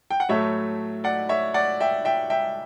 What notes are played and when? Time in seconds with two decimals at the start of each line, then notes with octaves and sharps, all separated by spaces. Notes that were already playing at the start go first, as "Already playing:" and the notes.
0.10 G5
0.20 F#5
0.29 A2 F#3 A3 C#5 E5
1.04 D5 F#5
1.29 C#5 E5
1.54 D5 F#5
1.81 E5 G5
2.05 E5 G5
2.30 E5 G5